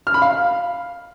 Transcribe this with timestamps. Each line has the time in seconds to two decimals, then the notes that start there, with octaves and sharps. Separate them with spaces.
0.07 F6
0.14 B5
0.22 F5